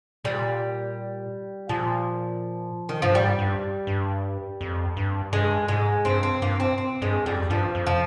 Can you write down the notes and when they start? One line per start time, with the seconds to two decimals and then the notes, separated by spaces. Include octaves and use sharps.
0.24 A#2 G3
1.69 A#2 F3
2.89 D#3
3.02 G2 F3
3.15 G#2 G3
3.39 G2
3.87 G2
4.61 F2
4.97 G2
5.33 G2 G#3
5.68 G#2 G#3
6.05 G2 C4
6.23 C4
6.42 G2 A#3
6.60 C4
6.78 C4
7.02 G2 G#3
7.26 F2 G3
7.50 G2 F3
7.75 F2
7.86 F3